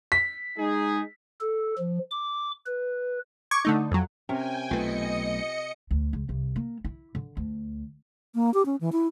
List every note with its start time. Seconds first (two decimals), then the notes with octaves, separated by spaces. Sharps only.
0.12 B6
0.58 G#3 D#4 G#4
1.41 A4
1.78 F3
2.11 D6
2.66 B4
3.51 C#6 D6 G#6
3.65 D3 A3 D#4
3.91 F2 F#3
4.29 C3 C#4 A#4 C#5 G5 G#5
4.71 B1 A3 F4 B4 D#5 C#7
5.91 D2
6.13 C#2
6.29 C2
6.56 A#3
6.84 E4
7.15 D3
7.37 D2
8.35 A#3
8.54 G4
8.66 C#4
8.81 E3
8.92 E4